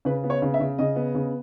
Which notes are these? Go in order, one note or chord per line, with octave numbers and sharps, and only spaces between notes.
C#3 B4
B3
C#5
C#3
E5
C#3
C#3 D#5
B3
C#3